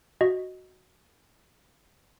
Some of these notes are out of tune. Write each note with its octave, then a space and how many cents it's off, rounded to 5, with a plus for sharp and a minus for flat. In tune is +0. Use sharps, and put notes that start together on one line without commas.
F#4 +0 D#5 +0